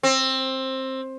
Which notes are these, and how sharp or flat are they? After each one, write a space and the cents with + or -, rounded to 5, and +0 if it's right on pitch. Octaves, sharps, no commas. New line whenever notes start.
C4 +15